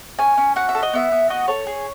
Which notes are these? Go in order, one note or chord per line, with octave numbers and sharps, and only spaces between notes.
C#4 G#5
C#4
F#4 F#5
E5
A4
D#5
B3 E5
B3
F#4 D#5
A4 C#5
G#4